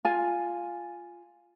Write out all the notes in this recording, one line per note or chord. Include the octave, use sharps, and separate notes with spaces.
F4 G#5